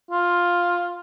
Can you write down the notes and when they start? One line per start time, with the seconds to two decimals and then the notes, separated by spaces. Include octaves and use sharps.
0.11 F4